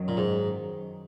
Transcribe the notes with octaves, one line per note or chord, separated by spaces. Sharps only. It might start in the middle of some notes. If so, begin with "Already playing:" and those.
Already playing: F#2 D#3 F#3
A#2
G#2